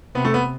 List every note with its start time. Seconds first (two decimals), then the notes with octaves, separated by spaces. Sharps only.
0.15 C3 B3
0.25 A3
0.34 B3